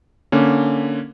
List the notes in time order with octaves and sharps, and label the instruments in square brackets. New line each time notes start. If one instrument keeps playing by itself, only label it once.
[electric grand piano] D3 A#3 C#4